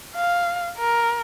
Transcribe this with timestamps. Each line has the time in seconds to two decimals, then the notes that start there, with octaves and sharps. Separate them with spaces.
0.16 F5
0.78 A#4